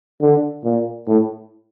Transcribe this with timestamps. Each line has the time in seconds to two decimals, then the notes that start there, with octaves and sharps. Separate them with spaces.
0.21 D3
0.64 A#2
1.08 A2